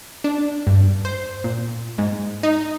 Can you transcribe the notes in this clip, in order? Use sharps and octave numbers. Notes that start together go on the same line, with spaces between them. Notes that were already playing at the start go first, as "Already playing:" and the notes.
D4
G2
C5
A#2
G#2
D#4